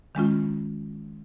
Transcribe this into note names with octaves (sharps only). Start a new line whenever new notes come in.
D#3 G#3 C#4 F4